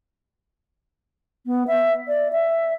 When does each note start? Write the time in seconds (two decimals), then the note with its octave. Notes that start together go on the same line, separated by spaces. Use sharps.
1.46 B3
1.67 E5
2.08 D5
2.32 E5